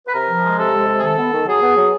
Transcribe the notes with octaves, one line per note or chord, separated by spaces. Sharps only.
B4
C3 A#4
F3
G#3
C3 A4
G#3
C3
G#4
D#3 A4
B3
D#3
F#3 G#4
B3
F#3